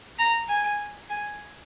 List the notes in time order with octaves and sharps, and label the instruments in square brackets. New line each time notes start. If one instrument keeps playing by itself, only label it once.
[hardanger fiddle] A#5
G#5
G#5